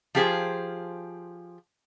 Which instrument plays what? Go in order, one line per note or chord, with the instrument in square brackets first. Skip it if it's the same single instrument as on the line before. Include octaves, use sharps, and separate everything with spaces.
[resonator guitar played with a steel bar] F3 F4 G4 G#4 C5